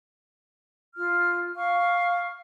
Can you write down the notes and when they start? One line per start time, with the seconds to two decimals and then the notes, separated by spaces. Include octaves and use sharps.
0.96 F4 F6
1.56 F5 C#6 F6